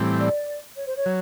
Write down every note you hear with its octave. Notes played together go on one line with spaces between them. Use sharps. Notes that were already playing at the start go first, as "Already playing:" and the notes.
Already playing: A2 E3 G3 C4
D5
C#5
C5
C#5
F#3